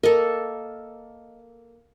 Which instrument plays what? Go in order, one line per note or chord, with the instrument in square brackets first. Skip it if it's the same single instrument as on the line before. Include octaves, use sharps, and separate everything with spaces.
[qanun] A#3 A4 [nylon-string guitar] A#4 D#5